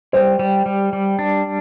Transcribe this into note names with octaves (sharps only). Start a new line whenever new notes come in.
G3 C5
G3
G3
G3
D4